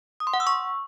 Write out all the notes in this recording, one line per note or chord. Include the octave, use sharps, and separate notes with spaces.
D#6
C6
F#5
E6
C#6